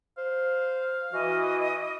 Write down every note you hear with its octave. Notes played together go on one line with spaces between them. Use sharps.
C5 F5
E3 F#4 D#5